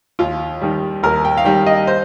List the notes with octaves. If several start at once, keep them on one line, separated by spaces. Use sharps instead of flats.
D#2 F4
D#3 G3
D#2 A#4
G5
F5
D#3 G3 G5
D#5
C5